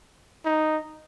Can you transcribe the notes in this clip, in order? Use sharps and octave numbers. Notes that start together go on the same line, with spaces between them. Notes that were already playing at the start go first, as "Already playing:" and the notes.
D#4